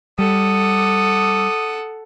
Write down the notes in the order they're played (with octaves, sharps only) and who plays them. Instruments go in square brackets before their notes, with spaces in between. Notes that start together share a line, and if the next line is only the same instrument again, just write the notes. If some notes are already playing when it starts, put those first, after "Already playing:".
[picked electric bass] G3 [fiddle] A4 F#5 [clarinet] D#6